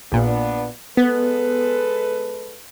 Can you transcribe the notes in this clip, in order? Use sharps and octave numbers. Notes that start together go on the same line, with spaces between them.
A#1 A#2 B3 D4
G#3 B3 A4 B4